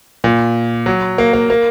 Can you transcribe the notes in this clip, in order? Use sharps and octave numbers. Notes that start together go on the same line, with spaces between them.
A#2
F#3
A#3
A#3
A#3